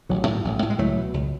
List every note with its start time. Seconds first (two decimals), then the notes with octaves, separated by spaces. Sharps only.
0.09 A1 D#3 F#3
0.27 A2
0.45 A1
0.62 A2
0.70 G#3
0.78 C#2 F#3 A3
0.97 B2
1.14 C#2